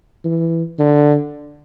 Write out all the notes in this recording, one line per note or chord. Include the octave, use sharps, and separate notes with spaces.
E3
D3